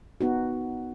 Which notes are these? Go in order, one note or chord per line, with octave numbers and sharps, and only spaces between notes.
B3 D#4 F#4